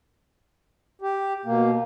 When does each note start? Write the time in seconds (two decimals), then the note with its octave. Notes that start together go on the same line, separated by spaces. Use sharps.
1.02 G4
1.45 B2 A#3